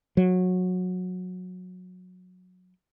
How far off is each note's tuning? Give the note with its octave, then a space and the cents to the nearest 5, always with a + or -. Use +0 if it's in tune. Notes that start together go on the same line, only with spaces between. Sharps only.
F#3 -20